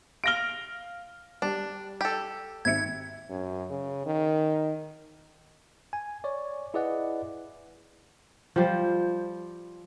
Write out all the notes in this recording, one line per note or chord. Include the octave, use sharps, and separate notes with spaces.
F5 F6 A#6 D7 G7
G3 D4
G4 A4
G#1 E5 G#6 C#7
F#2
C#3
D#3
G#5
C#5 D5
E4 G#4 B4 D5 D#5 F#5
F3 G3 C5